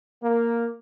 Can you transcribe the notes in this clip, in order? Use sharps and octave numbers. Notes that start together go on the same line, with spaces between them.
A#3